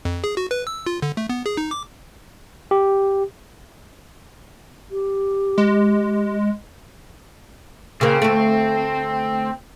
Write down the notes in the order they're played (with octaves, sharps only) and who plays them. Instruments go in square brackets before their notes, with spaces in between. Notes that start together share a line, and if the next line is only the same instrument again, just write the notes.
[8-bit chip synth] F2
G#4
F#4
B4
E6
F4
D3
A3
B3
G#4
D#4
D6
[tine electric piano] G4
[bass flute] G4
[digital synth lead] G#3
[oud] C#3 A#3 [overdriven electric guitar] C4
[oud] D2 A3